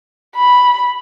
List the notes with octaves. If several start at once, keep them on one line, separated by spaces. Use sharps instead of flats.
B5